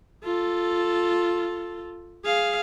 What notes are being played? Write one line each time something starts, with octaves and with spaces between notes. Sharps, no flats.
F4 A4
G#4 F5